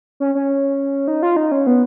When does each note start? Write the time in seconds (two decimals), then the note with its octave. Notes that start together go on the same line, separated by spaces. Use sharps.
0.20 C#4
0.35 C#4
1.08 D#4
1.23 F4
1.36 D#4
1.52 C#4
1.67 B3